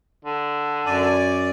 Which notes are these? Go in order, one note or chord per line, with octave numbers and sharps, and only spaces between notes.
D3
F#2 D5 G#5